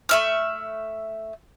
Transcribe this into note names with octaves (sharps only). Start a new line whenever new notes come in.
A3 E5 F6